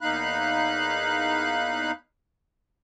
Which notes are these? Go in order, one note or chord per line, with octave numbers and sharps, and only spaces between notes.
E2 A#3 D#4 F5 B5 F#6